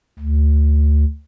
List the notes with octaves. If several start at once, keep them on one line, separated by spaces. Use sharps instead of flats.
D2